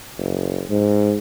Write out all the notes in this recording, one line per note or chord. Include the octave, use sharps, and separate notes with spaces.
F#1
G#2